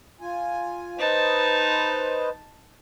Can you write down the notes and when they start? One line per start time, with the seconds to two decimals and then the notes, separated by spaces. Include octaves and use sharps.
0.21 F4 G#5
0.99 D#4 B4 C5 D#5 A5